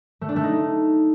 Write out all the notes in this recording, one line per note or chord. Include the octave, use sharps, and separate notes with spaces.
A3
D4
A3
D#4